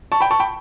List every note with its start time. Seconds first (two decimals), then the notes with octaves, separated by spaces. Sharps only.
0.12 A5 C#6
0.21 G5 B5
0.31 A5 C#6
0.40 G5 B5